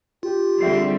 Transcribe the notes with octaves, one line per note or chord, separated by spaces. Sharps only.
F4 G4
D3 G3 C4 G#4 E5 C7